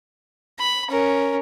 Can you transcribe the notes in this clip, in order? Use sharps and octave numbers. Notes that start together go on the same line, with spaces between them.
B5
C#4 A#4